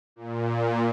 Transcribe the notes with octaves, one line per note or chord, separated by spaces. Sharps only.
A#2